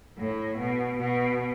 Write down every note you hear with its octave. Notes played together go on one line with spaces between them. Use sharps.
A2
B2
B2